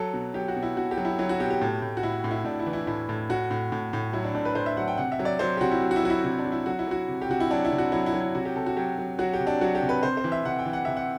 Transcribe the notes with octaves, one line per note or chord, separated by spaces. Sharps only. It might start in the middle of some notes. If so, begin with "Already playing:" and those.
Already playing: F#3 A4
B2
F#3 G4
F#4
B2
E4
B2 F#4
G4
F#3
E4
F#3 E4
F#4
B2 G4
G4
A2
A2
F#4
A2 E4
A2
E4
A2 D4
E4
E3
E4
A2 E4
A2
A2 F#4
A2
A2
A2
F#3 E4
D4
A2 D4
B4
A2 C5
E5
F#3 F#5
G5
C3 F#5
E5
F#3
D5
F#3 C5
G4
C3 F#4
E4
F#3
F#4
E4
F#3 F#4
E4
C3 E4
D4
F#3
E4
F#3 F#4
E4
F#3 F#4
C3
G4
C3 F#4
E4
F#3 D4
E4
C3
F#4
F#3 E4
E4
F#3
E4
C3 F#4
G4
C3 A4
F#4
F#3 G4
F#3
F#3 F#4
G4
C3
D4
F#3 F#4
G4
C3
B4
C3 C5
C5
E3
E5
C3 F#5
G5
E3
F#5
C3 E5
F#5